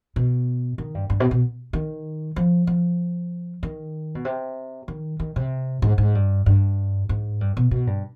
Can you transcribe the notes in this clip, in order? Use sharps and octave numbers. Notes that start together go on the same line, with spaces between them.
B2
D#3
G2
G2
B2
B2
D#3
F3
F3
D#3
B2
C3
D#3
D#3
C3
G#2
G#2
G2
G2
G#2
G2
B2
B2
G2